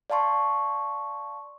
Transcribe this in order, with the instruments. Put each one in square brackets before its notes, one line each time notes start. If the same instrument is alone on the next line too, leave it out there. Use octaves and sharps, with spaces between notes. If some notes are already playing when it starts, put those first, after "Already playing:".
[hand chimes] D5 F5 A5 C6 C#6